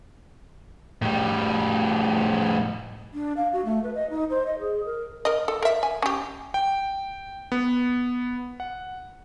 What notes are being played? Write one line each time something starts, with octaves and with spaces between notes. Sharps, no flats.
A2 G3
D4
F5
F#4
A3
B4
D#5
D#4
C5
D#5
G#4
A#4
A#4 D#5
A4
A#4 E5
G#5
C#4 G4
G5
B3
F#5